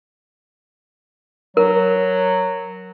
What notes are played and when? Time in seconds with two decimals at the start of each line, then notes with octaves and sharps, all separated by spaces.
1.57 F#3 A#4